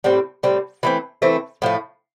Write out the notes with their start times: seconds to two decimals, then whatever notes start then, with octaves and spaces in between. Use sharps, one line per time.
0.04 A2 G3 C4
0.43 A2 G3 C4
0.83 E3 A3 C4
1.22 E3 A3 C4
1.62 A2 F3 A3